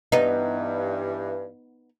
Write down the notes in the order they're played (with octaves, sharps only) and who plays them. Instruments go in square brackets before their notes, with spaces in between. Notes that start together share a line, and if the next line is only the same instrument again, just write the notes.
[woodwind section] G2 E3 [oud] B3 D#4